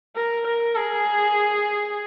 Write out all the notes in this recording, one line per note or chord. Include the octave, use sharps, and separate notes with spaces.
A#4
A#4
G#4